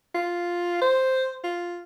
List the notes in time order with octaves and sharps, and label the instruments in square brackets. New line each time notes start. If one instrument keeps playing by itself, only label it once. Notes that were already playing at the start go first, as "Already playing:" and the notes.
[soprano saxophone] F4
C5
F4